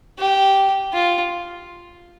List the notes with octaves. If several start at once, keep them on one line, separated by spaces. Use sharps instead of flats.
G4
F4